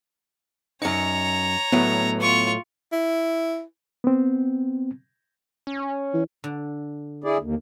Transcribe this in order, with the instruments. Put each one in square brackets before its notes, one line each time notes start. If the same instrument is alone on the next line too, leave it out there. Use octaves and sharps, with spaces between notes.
[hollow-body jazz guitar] F#2 D#4 [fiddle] C#5 A#5 [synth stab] C#7
[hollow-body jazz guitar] A2 F#3 [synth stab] B3
[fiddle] F4 C#6
[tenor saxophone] E4
[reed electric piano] B3 C4
[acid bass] C#4
[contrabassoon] E3
[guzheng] D3
[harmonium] E4 G#4 D5
D#2